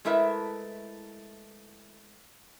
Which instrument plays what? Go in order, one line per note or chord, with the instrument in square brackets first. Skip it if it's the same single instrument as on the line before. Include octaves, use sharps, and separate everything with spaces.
[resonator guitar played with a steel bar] G#3 A3 E4 A#4 B4 E5